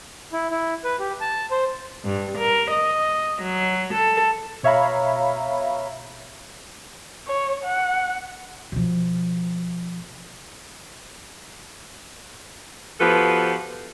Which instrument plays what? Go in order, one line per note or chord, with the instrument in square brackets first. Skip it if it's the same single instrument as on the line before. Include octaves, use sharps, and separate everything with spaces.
[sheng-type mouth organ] E4
E4
B4
G4
A5
C5
[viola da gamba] G2
A#4
D#5
F#3
A4
[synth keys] B2 C#5 E5 F5 A#5 B5
[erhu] C#5
F#5
[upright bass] B2 F3
[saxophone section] F3 B3 F#4 G4 A4 B4